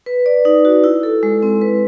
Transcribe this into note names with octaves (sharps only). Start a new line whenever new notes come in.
B4
D5
D#4
F#4
E4
A4
G#3
C4
B4